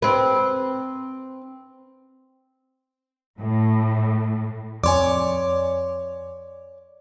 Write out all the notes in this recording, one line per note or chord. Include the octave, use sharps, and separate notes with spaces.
C4 B4
A2
F2 C#5 D5 G#5 C6 D6